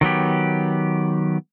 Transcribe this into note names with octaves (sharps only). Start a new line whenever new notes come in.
D#3 F#3 B3 G4